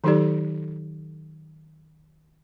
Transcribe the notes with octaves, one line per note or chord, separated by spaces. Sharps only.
D#3 F#3 D#4 G4 A4 D5